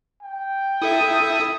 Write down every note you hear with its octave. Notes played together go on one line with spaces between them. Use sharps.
G5
E4 A4 E5 D#6